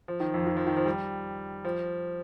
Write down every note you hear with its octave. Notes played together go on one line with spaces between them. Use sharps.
F3
D#3
F2
D#3
F3
D#3
F3
G3
F3